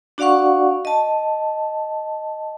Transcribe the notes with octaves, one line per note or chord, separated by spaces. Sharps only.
D4 F#4 D5 F5 F#5 C#6
D#5 A5